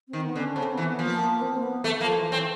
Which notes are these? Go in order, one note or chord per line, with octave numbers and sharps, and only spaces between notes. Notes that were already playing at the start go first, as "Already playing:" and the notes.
D#3 C4
B3
D3
C#4
C#3 C4
E3 B3
B3
F3
A#3
A#3
C4
A#3
B3
A3
F3 A#3
E3
E3 C4